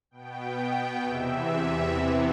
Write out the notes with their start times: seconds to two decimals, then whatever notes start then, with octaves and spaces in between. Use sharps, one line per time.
0.11 B2 B3 G5
1.03 E2 C3 E3 E5
1.49 E5
1.95 C3 E3 B3